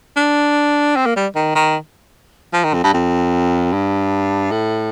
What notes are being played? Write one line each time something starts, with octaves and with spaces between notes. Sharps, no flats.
D4
C4
A#3
G3
D#3
D#3
F3
D#3
F2
G2
F2
G2
A2